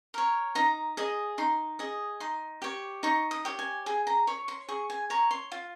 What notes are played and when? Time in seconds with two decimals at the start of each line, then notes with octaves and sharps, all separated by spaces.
0.14 A#4 C#5
0.55 D#4 A#5
0.97 G#4 D#5
1.38 D#4 C6
1.79 G#4 D#5
2.20 D#4 C6
2.62 G4 C#5
3.03 D#4 C#6
3.31 D#6
3.45 G4 C#5
3.59 G#5
3.86 G#4 G#5
4.07 A#5
4.27 C#5 C#6
4.48 C6
4.69 G#4 C#6
4.90 G#5
5.10 C#5 A#5
5.31 C6
5.52 F4